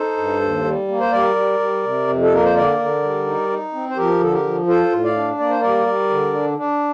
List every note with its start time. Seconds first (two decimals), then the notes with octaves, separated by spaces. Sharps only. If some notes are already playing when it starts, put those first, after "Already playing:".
Already playing: D#4 A4 C5
0.17 G2
0.41 D#2
0.64 G3
0.88 A#3
1.00 C5
1.11 G3 A#4 D5
1.36 G3
1.60 G3
1.83 C3
2.08 F2
2.23 A4
2.31 A#3 A#4
2.44 C5
2.55 D3 A#4 D5
2.79 D3
3.02 G3
3.26 D#4
3.49 D#4
3.73 C4
3.89 C5
3.96 F3 G4 A#4
4.20 D3 A4
4.32 G4 A#4
4.44 F3
4.67 F4 A4 C5
4.91 A2
5.04 D5 F5
5.16 D4
5.39 A#3 D5
5.50 C5
5.60 G3 A#4 D5
5.87 G3
6.10 D3
6.34 D4
6.57 D4